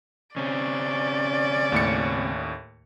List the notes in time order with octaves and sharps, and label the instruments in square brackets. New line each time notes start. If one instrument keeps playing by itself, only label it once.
[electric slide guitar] C#3 C4 [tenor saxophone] C#4 [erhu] D5
[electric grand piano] D#2 A2 C#7